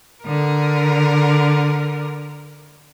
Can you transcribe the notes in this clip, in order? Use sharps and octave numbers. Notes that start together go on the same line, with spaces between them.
D3 A#4